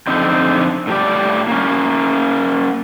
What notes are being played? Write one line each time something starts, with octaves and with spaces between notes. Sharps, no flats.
F2 D3 C4 D#4
A2 G4 D5
A#3 C#4